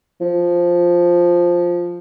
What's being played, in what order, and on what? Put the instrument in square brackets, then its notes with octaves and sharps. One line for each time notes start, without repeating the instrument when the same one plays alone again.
[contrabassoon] F3